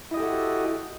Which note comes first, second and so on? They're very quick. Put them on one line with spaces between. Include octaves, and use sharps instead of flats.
E4 D#5 G4 A4 F#4